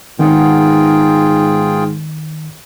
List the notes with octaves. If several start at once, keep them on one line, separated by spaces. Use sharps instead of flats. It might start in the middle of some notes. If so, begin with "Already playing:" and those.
G#2 D#3 B3 D#4 F4 G#4 F#5 G5